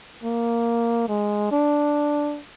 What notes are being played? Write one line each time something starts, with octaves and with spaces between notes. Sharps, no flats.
A#3
G#3
D4